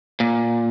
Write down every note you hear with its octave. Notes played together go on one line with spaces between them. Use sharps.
A#2